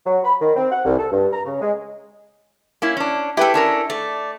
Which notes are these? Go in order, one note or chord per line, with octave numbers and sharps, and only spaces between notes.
F#3
B5
D#3
C4
F#5
C2
A4
G2
A#5
C#3
G#3
A#3 C#4 E4
C#4 D4
E4 G4 A4 B4 G5
C#4 D4 A#4
A3 D5